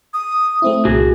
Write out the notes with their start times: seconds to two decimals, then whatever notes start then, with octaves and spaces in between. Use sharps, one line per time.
0.14 D#6
0.62 A3 C4 E4
0.85 C2 A#2 F#4 G#4